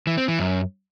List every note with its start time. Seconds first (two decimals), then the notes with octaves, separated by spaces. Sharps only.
0.07 E3
0.18 C4
0.28 E3
0.39 F#2